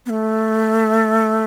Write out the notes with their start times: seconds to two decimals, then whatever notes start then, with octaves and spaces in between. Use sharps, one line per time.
0.06 B3
0.10 A3